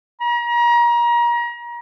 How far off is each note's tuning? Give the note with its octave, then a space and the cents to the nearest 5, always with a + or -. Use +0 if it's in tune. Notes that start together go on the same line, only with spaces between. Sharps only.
A#5 +35